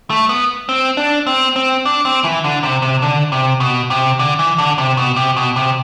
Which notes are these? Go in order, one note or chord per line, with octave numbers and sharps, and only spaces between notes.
A3
B3
C4
D4
C4
C4
D4
C4
E3
D3
C3
C3
D3
C3
B2
C3
D3
E3
D3
C3
B2
C3
B2
C3